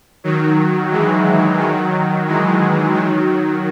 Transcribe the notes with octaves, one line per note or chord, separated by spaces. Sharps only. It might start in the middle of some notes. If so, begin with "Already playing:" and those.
D#3 F#3
E3 G#3
D#3 F#3
E3 G#3
D#3 F#3